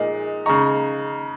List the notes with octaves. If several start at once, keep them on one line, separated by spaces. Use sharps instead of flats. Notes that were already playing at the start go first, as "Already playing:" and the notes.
Already playing: A#2 G#3 D#4
C#3 G#3 D#4 A#5 C#6